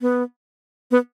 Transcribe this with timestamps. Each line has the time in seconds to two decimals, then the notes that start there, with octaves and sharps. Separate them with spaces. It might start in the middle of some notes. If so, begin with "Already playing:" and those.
0.01 B3
0.91 B3